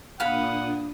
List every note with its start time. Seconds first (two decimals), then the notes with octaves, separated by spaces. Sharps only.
0.20 A#2 D4 F5 F#5 B5 D#6